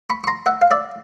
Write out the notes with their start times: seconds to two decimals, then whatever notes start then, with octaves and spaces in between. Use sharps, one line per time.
0.10 B5 C#6
0.24 C#6
0.27 A#5 C6
0.46 E5 F#5
0.62 F5
0.71 D5 E5